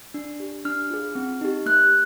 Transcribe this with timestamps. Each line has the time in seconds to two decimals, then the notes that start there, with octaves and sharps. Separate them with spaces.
0.14 D4
0.40 G4
0.65 D4 F6
0.90 F4 G#4
1.15 C4
1.41 D#4 G4
1.66 A#3 F#6